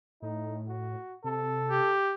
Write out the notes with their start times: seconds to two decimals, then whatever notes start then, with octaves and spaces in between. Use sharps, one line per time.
0.22 A2 D#4
0.68 F#4
1.24 C3 A4
1.71 G4